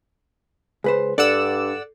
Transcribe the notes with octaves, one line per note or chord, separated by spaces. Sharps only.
C#2 G#4 B4 C5
G2 D4 A4 D5 F#5 E6